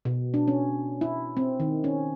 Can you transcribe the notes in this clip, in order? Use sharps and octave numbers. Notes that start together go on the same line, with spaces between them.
B2
D4
C#4
E4
C4
D#3
C#4